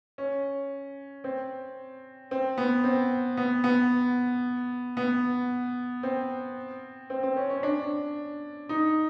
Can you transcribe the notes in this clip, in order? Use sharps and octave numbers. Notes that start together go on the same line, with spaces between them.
C#4
C4
C4
B3
C4
B3
B3
B3
C4
C4
C4
C#4
C#4
D4
D#4